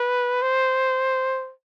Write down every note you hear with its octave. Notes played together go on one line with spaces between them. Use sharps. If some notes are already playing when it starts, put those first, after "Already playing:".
Already playing: B4
C5